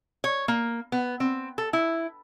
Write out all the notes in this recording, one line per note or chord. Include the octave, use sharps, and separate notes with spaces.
C#5
A#3
B3
C4
A4
E4